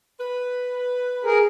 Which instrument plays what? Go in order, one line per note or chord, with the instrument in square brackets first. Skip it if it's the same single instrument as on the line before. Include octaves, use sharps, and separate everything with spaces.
[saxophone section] B4
[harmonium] G#4 A#4